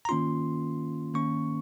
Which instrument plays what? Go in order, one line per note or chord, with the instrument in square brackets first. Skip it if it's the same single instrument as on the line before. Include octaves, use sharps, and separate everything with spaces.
[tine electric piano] A#5
D#3 A#3 C#4 F4 C6
D#3 A#3 C#4 C#6